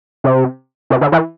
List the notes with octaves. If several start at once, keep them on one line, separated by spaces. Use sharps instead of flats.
C3
C3
D3
E3